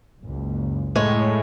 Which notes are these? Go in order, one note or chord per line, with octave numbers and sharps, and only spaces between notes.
F#1 C#2
A2 G#3 C#5